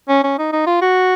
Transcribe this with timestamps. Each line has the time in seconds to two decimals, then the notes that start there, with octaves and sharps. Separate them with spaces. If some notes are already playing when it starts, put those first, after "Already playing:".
0.09 C#4
0.24 C#4
0.38 D#4
0.52 D#4
0.67 F4
0.81 F#4